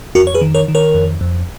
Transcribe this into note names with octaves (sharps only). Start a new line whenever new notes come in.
F2 F#4 A#4
C#5
G#4 B4
D#3
A#4 C#5
D#3
A#4 C#5
F2
F2